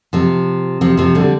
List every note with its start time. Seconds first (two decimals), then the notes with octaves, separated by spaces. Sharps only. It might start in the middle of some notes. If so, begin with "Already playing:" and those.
0.13 C3 F3
0.81 C3 F3
0.97 C3 F3
1.15 D3 G3